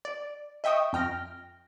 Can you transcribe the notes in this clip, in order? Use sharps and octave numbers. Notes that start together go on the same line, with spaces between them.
D5
D#5 E5 G5 C#6 D#6
F2 G5 F6 A#6